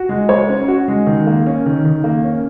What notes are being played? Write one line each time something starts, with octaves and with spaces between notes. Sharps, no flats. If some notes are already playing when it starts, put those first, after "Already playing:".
Already playing: F#4
G#3
C#5
C#4
F#4
G#3
D#3
A#3
C#4
D#3
D#3
A#3
C#4